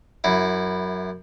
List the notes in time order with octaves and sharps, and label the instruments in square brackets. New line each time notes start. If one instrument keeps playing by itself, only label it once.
[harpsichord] F#2 E4